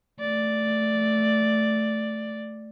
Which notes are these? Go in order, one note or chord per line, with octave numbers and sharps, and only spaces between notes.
A3 D5